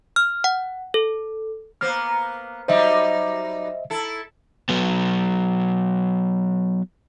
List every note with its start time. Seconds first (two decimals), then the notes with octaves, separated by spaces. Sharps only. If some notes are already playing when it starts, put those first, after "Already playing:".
0.16 F6
0.44 F#5
0.94 A4
1.81 A#3 B3 C5 F6
2.68 F#3 G3 D#4 C5 D#5 E5
3.90 E4 A4
4.69 F#3 B3